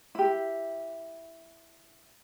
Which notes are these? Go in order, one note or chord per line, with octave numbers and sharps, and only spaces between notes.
E4 G4